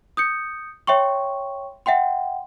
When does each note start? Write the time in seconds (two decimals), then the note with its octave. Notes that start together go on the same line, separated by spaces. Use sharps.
0.17 D#6 G6 C#7
0.87 C#5 E5 G5 C6 C#6
1.86 E5 F#5 G5 C6